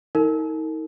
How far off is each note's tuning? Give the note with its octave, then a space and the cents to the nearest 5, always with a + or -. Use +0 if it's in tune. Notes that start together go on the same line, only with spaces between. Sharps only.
D#4 +35 A#4 -35